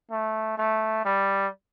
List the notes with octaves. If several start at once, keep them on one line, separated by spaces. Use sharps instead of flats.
A3
A3
G3